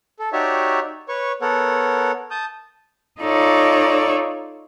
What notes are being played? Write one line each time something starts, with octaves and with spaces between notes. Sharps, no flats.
A4
D#4 F#4 G4 C#5 D5 E5
B4 C#5 C#6
B3 A4 A#4 C#5 F#5
A5 D#6 G6
D#4 F4 A4 C#5 D5